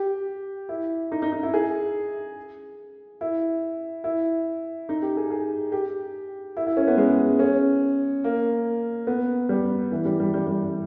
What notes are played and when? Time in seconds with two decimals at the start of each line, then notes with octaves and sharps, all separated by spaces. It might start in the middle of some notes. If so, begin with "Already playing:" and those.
Already playing: G4
0.69 E4
1.12 D#4
1.22 D#4
1.32 D#4
1.43 E4
1.54 G#4
3.21 E4
4.04 E4
4.89 D#4
5.02 G4
5.17 G#4
5.30 G#4
5.72 G4
6.57 E4
6.67 E4
6.77 C#4
6.87 B3
6.97 G#3
7.39 C#4
8.24 A#3
9.07 B3
9.49 G3
9.92 E3
10.05 G3
10.20 G3
10.34 G3
10.47 G3